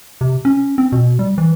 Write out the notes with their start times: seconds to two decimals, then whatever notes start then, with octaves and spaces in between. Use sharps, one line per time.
0.21 C3
0.45 C#4
0.78 C4
0.92 B2
1.19 G3
1.38 E3